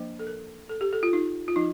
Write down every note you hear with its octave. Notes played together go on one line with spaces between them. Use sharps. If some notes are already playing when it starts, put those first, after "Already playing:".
Already playing: F3 A#3 D4 C5
A4
A#4
A4
G4
A4
F4
D#4
F4
F3 D#4